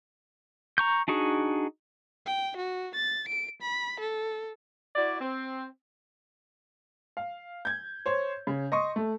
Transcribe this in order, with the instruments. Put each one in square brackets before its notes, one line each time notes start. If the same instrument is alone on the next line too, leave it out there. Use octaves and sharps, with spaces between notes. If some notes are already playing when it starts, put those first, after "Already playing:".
[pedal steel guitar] A#5 C#6 G6
D4 D#4 F#4 G#4
[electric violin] G5
F#4
A6
D7
B5
A4
[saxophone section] E4 F#4 D5
C4
[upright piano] F5
G6 G#6
C5 C#5
C#3
D#5 C6 C#6 D#6
A3